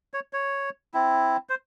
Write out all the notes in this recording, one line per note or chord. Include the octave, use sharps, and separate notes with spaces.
C#5
C#5
C4 E4
C5